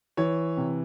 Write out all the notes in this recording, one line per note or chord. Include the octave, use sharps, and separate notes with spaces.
E3 C#5
C3